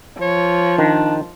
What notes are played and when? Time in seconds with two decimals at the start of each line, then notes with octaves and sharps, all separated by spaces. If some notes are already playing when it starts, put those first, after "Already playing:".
0.21 F3 C#5
0.78 D#3 D4